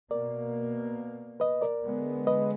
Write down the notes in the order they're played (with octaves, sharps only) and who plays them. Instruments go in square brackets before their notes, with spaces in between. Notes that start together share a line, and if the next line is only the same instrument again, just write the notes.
[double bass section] B2 A#3 [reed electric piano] A#4 D5
[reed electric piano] B4 D#5
A#4 D5
[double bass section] D3 G#3 B3
[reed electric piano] B4 D#5